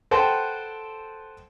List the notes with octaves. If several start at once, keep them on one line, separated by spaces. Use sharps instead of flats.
A4 B4 C5 F#5 G5 A5